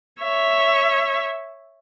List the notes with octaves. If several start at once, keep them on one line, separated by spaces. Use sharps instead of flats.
C#5 E5